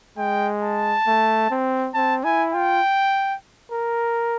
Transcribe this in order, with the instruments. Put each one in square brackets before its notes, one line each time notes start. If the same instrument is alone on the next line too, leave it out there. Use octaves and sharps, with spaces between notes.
[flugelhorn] G#3 [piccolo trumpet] G5
[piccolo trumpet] A5
[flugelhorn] A3
C4
[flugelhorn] C4 [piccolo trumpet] A5
[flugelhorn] E4 [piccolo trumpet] G#5
[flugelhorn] F4 [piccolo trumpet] G5
[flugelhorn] A#4